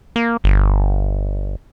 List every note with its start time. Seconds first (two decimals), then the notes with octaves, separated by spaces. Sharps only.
0.16 A#3
0.44 G1